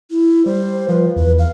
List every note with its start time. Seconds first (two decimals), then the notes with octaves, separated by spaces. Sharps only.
0.11 E4
0.46 G3 C5
0.88 F3 B4
1.16 E2 B4
1.39 F5